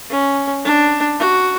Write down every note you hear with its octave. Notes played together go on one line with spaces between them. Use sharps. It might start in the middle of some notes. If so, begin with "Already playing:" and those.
C#4
D4
F#4